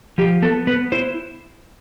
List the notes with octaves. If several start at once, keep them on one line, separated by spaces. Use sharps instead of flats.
F3 G4
B3 A4
B3 B4
E4 C5